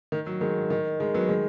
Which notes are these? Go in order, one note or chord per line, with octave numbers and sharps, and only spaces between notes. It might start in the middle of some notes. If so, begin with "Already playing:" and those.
D#3
F#3
D#3 G#3
D#3
D#3 G#3
F#3 B3
D#3 G#3